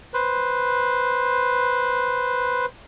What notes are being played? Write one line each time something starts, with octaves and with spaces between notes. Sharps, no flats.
B4 C5